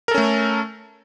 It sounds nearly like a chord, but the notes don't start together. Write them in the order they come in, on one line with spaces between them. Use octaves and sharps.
A#4 A4 C#4 A3